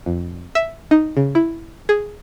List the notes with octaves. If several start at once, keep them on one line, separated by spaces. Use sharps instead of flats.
F2
E5
D#4
C#3
E4
G#4